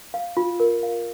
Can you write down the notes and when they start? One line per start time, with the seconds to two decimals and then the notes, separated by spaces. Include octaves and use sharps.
0.14 F5
0.37 F4
0.60 A#4
0.83 F5